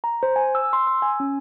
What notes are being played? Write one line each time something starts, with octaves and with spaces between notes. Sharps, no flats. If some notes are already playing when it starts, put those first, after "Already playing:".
A#5
C5
G#5
E6
C6
E6
G#5
C#4